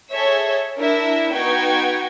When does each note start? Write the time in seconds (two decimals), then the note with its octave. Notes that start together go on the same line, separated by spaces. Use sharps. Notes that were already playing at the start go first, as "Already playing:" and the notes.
0.11 G#4 A4 C#5 E5
0.79 D4 E4 A#4 E5
1.32 B3 D#4 F#4 G5 G#6